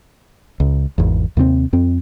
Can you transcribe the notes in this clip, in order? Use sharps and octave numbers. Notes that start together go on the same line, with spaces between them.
C#2
G#1 E2
D#2 C3 A3 C4
F2 C4